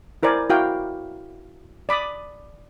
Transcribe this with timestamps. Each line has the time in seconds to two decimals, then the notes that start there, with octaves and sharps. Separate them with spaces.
0.23 E4 A#4 C5 D5 G#5
0.49 E4 F#4 A#4 F5 G5
1.89 D5 B5 D6 D#6